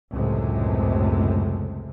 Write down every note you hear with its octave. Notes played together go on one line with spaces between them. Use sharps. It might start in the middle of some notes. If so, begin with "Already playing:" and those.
C#2 F#2 A2 C3 G#3 A3